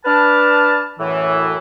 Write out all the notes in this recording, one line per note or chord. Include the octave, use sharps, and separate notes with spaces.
D4 B4 A5 F6
F#2 A2 E3